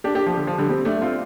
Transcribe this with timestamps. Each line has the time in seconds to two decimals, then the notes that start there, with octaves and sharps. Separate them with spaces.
0.04 D4 G4
0.15 D4 G4
0.26 F3
0.37 D3
0.47 F3
0.58 D3 G3
0.69 G3 C4
0.85 A3 D4
1.02 C4 F4